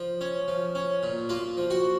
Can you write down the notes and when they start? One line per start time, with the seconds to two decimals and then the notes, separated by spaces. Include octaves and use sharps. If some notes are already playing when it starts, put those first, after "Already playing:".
Already playing: F3
0.21 C#4
0.48 F3
0.75 C#4
1.03 A#2
1.29 A#3 F4
1.57 F3
1.70 F#4